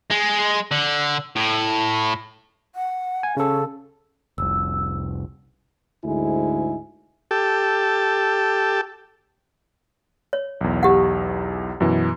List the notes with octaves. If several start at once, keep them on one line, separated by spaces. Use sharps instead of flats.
G#3
D3
A2
F#5
G#5
C#3 C#4 A4
F1 C2 E6
D2 G#2 G#3 E4 G#5
G4 A4
C#5
B1 E2
G4 F#5
F#2 B2 E3